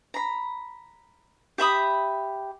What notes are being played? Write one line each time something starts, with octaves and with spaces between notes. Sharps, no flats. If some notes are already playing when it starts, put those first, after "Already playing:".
A#5 B5
G4 E5 B5 D#6